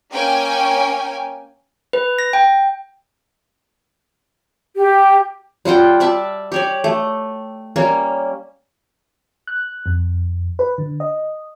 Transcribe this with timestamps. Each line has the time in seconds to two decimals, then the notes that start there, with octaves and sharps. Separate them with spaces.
0.12 A#3 C#4 G5 G#5
1.93 B4
2.18 A#6
2.33 G5
4.76 G4
5.65 G3 F4 F#5 G5
6.00 D5 E5 A5
6.52 G4 C#5 D5
6.84 A3
7.76 G3 A#3 C#4
9.47 F#6
9.86 F2
10.59 B4
10.78 D3
11.00 D#5